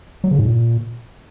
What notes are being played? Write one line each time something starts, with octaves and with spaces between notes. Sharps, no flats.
F#3
C#3
G#2
A#2